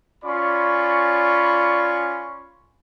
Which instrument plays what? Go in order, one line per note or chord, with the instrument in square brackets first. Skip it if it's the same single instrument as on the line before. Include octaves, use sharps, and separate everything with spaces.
[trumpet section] C#4 F4 D5 B5 C#6